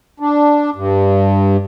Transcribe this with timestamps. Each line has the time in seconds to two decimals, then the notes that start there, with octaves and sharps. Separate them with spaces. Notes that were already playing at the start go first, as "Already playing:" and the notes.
0.20 D4
0.76 G2